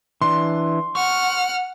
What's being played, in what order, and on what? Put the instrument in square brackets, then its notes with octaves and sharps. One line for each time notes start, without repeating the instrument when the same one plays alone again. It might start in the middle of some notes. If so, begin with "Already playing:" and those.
[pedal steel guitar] E3 D4 [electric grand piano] C6
[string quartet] F#5 F6 [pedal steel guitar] C#6